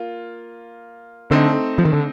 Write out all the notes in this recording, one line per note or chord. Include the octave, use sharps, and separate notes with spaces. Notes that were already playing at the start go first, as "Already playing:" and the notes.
Already playing: A#3 F4
D3 A3 C4 D#4
F3
D#3
D3